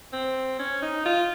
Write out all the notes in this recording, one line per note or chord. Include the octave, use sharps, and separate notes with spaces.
C4
C#4
D#4
F4